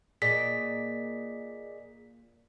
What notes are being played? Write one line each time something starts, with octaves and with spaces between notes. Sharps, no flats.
A#2 G#4 D5 D#5 B6